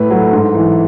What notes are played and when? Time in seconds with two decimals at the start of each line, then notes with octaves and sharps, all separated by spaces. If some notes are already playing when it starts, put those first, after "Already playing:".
Already playing: A2 B4
0.10 F#3 A4
0.33 G#2
0.55 E3